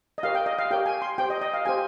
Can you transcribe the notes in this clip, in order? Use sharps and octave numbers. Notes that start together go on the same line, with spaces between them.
D#5
G4 A#4 C#5 F5
G5
D#5
F5
G4 A#4 C#5 G5
G#5
C6
G4 C5 G5
D#5
D#5
F5
G4 C5 G#5